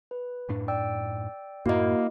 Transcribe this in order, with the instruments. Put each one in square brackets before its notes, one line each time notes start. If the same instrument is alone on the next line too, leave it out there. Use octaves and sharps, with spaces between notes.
[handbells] B4
[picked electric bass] F#2 A2 D4
[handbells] D5 G5 E6
[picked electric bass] F#2 A2 [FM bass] A#3 [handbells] E4 [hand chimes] F#4 D#5